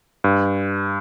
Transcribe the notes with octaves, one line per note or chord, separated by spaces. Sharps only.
G2